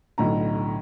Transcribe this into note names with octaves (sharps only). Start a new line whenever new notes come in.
B1 A2 D3 A#5